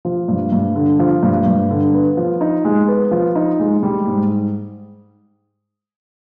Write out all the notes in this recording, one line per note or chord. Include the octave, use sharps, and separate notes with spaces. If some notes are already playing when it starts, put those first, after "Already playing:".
F3
G2
G2
D3
F3
G2
G2
D3
B3
F3
D#4
G#3
B3
F3
D#4
G#3
G3
G#2